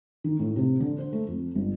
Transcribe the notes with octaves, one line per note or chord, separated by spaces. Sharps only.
D#3
A2
C3
D3
C5
A3
F2
G1